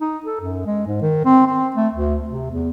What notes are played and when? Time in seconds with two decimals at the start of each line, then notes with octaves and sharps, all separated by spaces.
0.01 D#4
0.26 A4
0.41 F#2
0.66 G#3
0.87 G#2
1.02 D#3
1.25 C4
1.47 C4
1.76 A3
1.93 D2
2.29 C3
2.52 E2